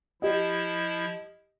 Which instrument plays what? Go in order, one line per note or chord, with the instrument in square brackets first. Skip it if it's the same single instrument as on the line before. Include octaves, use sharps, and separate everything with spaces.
[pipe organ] F3 E4 [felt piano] G4 D#5